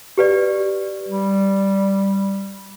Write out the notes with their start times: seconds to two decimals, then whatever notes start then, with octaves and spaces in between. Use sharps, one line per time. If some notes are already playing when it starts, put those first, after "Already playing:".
0.18 G4 B4 D5
1.08 G3